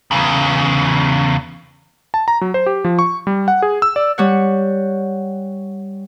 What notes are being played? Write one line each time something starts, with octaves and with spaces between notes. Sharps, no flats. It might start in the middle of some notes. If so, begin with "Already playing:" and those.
E2 C#3
A5
A#5
F#3
C5
G4
F3
C#6
G3
F#5
G#4
E6
D5
G3 C#5 F#5